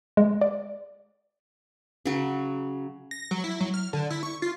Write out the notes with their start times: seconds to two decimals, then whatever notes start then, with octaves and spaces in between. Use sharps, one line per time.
0.17 G#3
0.41 D5
2.05 C#3 F#3
3.11 A#6
3.31 F#3
3.44 E4
3.60 F#3
3.74 F6
3.93 D3
4.10 E4
4.23 C#6
4.42 F4